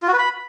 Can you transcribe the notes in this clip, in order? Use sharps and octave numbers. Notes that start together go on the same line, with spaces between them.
F4
F#4
B4
B5